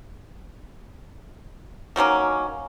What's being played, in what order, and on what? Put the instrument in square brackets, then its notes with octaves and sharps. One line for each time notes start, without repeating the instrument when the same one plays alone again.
[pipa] D#3 F#3 A#3 C#4